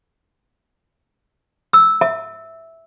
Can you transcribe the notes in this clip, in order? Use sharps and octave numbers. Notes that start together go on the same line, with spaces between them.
E6
E5